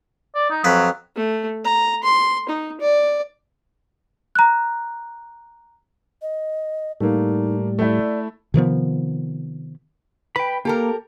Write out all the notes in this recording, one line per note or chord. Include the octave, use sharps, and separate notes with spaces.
D5
D#4
F2 F#3 B4
A3
A#5
C6
D#4
D5
A#5 F#6
D#5
A2 G3 A3 A#3 D#4
A3 E4 D5
C3 D#3 F3 B3
B4 G5 B5
A#3 G4 A4 A#4